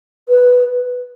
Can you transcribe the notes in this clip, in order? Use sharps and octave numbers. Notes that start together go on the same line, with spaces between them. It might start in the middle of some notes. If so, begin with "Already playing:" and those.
B4